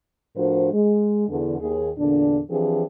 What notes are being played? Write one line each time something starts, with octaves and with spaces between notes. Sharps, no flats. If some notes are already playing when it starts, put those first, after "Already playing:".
A2 F3 D4 F#4 A#4 C5
G#3
E2 D3
D#2 G#4
E2 A#2 D3 D4
E3 F3 C4 D4 G4 G#4